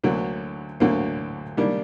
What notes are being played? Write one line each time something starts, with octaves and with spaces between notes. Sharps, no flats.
D2 D3 F#3 A#3
D2 D3 F#3 A#3
G#2 D#3 G3 A#3 D4